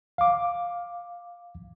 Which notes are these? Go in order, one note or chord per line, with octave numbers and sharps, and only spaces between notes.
F5 D6